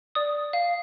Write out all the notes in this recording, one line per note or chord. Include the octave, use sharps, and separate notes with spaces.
D5 D#6
F5